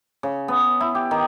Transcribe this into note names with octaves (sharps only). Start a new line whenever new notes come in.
C#3
B3
E4
G4
D#3